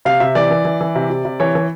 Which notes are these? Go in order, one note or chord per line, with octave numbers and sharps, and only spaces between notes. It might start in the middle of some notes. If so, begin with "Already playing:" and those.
C3 F5
C3 E5
E3 D5
E3
E3
E3
C3
C3
C3
E3 C#5
E3